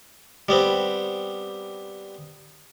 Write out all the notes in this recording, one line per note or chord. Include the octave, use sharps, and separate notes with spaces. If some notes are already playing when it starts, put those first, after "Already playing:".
G3 B3 C4